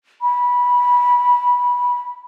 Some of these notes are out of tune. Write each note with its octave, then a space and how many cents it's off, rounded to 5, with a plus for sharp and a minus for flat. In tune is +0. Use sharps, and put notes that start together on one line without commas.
B5 -15